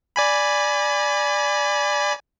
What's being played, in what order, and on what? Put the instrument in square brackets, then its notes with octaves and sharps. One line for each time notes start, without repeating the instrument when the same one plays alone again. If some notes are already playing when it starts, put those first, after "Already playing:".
[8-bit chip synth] D5 G#5 B5